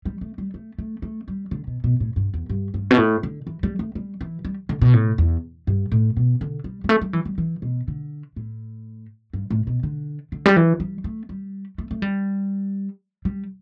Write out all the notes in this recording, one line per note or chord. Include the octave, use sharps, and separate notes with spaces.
G3
A3
G3
A3
A3
A3
G3
D3
B2
B2
A2
G2
E2
G2
G2
B2
A2
D3
E3
G3
A3
G3
E3
G3
D3
B2
A2
E2
G2
A2
B2
D3
G3
G3
A3
G3
E3
G3
E3
B2
D3
A2
G2
A2
B2
D3
D3
G3
E3
G3
A3
G3
A3
A3
G3
G3